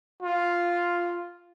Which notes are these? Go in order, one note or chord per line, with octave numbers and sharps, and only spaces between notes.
F4